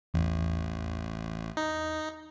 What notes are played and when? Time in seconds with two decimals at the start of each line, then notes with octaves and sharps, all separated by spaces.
0.14 A1 E2
1.57 D#4